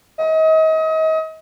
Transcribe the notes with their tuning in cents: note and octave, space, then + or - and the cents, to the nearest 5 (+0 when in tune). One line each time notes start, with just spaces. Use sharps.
D#5 +35